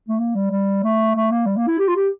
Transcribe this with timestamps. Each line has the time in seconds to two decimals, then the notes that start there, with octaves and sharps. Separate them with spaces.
0.09 A3
0.20 A#3
0.36 G3
0.51 G3
0.84 A3
1.15 A3
1.31 A#3
1.46 G3
1.57 A#3
1.68 E4
1.79 G4
1.88 F4
1.96 G4